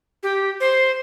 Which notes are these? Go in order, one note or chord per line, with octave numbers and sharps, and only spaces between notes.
G4
C5